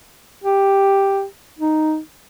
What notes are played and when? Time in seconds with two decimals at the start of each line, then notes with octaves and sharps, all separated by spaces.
0.44 G4
1.58 D#4